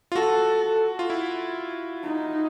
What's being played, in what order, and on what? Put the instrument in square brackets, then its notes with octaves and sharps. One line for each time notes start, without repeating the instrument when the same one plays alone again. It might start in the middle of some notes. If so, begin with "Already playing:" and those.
[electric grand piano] F4
[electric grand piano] F#4 [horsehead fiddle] A4
[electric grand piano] F4
E4
[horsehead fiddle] D#4